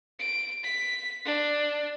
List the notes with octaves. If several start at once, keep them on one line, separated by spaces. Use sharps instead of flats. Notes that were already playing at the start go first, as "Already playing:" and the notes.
D7
B6
D4